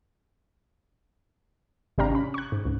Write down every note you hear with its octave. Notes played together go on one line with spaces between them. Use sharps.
G#1 C3 D4 G4 F5 A#5
C#4 B5
C#6 F#6
G#2
C#2 G#2